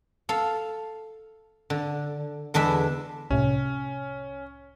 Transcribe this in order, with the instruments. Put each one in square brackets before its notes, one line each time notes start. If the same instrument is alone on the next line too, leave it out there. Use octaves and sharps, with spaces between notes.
[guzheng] A4 F5
D3
E2 D3 G#3 D4 E5 B5
[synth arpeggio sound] C2 A2 C3 [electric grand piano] C#4